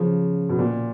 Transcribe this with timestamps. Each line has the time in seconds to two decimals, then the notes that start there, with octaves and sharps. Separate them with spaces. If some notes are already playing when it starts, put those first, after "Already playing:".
Already playing: C#3 F3
0.49 B2
0.59 A#2